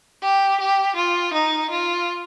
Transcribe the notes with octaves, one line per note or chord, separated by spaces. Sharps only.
G4
G4
F4
D#4
F4